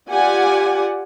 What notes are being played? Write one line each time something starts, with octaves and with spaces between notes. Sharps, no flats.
F4 G4 D5 F#5 G#5